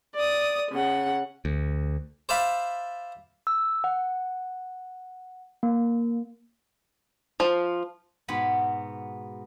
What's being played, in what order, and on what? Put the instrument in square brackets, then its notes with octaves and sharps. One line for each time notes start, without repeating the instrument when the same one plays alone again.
[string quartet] D5 D#6
C#3 F#5
[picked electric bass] D2
[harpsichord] C5 D5 E5 F5 A5 B5
[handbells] E6
F#5
A#3
[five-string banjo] F3
[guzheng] G#2 B2 B3 B5